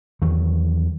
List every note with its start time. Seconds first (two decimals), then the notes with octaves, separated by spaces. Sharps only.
0.22 E2 D#3 F#3